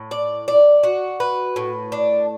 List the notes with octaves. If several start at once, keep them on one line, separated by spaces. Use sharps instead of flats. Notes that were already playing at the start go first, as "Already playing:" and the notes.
Already playing: A2
D5
D5
F#4
B4
A2
D4